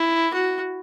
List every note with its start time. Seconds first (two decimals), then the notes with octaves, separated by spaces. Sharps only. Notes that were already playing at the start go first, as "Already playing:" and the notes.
Already playing: E4
0.34 F#4